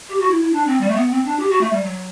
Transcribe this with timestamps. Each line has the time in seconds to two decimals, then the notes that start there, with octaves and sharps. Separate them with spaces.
0.09 G4
0.20 F#4
0.30 E4
0.41 E4
0.52 D4
0.67 C4
0.81 G3
0.89 A3
0.96 B3
1.10 C4
1.25 D4
1.39 G4
1.50 F#4
1.61 A3
1.73 G3
1.83 F#3